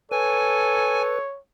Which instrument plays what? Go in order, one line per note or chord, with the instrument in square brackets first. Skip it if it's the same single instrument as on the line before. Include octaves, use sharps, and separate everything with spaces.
[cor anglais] A4 [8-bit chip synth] B4 [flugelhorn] C#5 [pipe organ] G#5